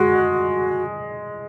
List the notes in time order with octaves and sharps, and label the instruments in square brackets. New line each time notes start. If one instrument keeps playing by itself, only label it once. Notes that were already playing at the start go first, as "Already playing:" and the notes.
Already playing: [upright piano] G#3 [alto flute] F#4